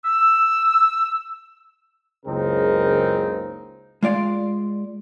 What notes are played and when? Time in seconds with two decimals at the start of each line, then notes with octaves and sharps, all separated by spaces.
0.05 E6
2.26 F#1 C#2 C#3 C4 D#4 A#4
4.03 G#3 F4 D5 F5